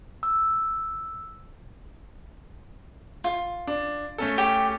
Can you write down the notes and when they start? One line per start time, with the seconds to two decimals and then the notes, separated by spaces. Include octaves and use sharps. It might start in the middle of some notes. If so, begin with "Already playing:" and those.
0.23 E6
3.24 F4
3.67 D4
4.18 A3 C#4 A4
4.38 G4